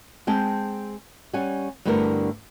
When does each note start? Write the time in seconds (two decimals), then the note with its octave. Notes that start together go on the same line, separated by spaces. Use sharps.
0.27 G#3 C4 G5 A5
1.33 G3 C#4 F#5 G#5
1.85 G2 D3 A3 B3 E4 A#4